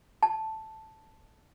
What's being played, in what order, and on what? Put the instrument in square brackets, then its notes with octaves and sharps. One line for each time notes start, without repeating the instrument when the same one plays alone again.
[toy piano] A5